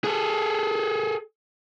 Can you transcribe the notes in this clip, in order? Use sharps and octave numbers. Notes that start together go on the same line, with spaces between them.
G#4 A4